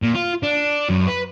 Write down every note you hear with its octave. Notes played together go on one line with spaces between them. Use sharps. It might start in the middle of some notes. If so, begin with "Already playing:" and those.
A#2
F4
D4
F#2
B4